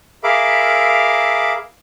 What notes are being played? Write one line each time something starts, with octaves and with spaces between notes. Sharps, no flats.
G#4 A#4 E5 F5 B5 D6